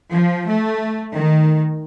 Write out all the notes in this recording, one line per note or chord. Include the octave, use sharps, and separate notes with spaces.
F3
A3
D#3